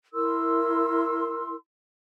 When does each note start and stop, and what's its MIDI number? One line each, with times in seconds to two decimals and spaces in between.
0.14 1.54 64
0.14 1.54 70
0.14 1.54 84
0.14 1.54 88